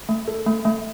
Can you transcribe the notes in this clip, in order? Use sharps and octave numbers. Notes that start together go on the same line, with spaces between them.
A3
A4
A3
A3